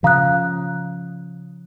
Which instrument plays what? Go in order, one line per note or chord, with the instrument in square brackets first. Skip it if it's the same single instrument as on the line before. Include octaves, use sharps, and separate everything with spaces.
[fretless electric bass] C#3 F3 [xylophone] F5 A#5 D#6 F#6